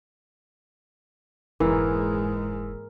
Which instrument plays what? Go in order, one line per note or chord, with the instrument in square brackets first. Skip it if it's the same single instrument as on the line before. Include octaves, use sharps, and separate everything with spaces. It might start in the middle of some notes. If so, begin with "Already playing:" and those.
[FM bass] F1 [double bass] G#2 G#3 [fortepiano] E3 [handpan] A#4